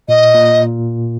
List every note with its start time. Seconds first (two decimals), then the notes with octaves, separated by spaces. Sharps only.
0.09 A#2 D#5
0.34 A#2